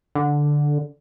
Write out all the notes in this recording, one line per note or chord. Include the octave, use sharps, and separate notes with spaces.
D3